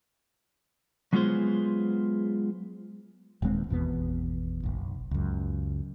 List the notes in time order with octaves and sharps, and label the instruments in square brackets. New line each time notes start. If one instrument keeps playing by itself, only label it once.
[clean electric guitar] F#3 G#3 B3 F4 G#4 C5
[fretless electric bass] D#1 D#2 G#3 C4
G#1 E2 B2 B3
F#1 B1
C#2 F#2